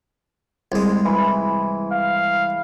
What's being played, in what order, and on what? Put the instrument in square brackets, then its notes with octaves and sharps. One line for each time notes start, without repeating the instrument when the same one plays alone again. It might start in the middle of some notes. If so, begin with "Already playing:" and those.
[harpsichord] C2 G#3
[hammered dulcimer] E3 B5
[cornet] F5